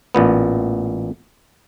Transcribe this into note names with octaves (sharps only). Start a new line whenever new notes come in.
A1 A#2 B3